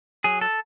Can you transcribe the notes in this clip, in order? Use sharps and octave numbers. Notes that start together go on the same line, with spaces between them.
F#3 G#4
A4